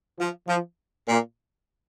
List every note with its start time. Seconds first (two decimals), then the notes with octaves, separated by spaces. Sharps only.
0.19 F3
0.48 F3
1.08 A#2